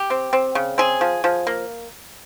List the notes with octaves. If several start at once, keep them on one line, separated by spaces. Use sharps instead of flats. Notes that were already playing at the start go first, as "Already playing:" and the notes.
Already playing: G4
C4
C4
C#3
C4 G#4
F3
F3
A#3